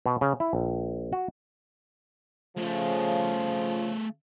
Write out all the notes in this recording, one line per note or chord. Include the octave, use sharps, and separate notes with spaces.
B2
C#3
E4
A#1
F#4
C#3 F3 A3 G#4